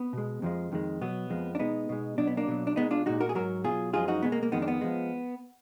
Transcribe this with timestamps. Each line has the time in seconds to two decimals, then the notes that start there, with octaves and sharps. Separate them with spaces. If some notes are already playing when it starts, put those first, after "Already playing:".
Already playing: B3
0.13 B2 G#3
0.42 F2 F3 G#3
0.72 F2 D#3 G#3
1.01 B2 F#3 B3
1.30 F2 F3 G#3
1.55 D4
1.59 B2 G#3 B3 D#4
1.89 B2 G#3
2.18 B2 F#3 D4
2.27 B3
2.37 A#3 D4
2.48 B2 F#3
2.67 D4
2.76 B2 G#3 B3 D#4
2.91 D4 F4
3.06 A#2 G#3 D#4 F#4
3.20 F#4 A#4
3.29 G#4
3.35 G#2 F#3 F#4 A#4
3.64 B2 F#3 F4 G#4
3.93 F#2 F3 G#3 F4 G#4
4.08 D#4 F#4
4.22 B2 G#3 B3
4.32 A#3
4.43 A#3
4.52 F2 D#3 G#3 B3
4.62 D4
4.68 B3
4.81 F3 G#3